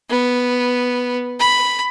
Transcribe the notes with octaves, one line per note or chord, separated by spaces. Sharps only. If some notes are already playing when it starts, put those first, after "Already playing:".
B3
B5